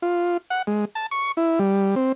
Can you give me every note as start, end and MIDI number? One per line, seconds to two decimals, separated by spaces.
0.02 0.37 65
0.50 0.62 78
0.67 0.85 56
0.95 1.06 81
1.11 1.32 85
1.37 1.59 64
1.59 1.95 55
1.96 2.12 60